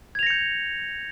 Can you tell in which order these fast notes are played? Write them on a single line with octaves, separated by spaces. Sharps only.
G#6 F7 A#6 C#7 G6